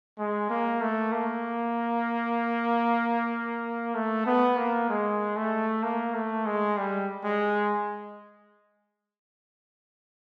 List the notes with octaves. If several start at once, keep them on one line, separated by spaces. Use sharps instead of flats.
G#3
A#3
A3
A#3
A3
B3
A#3
G#3
A3
A#3
A3
G#3
G3
G#3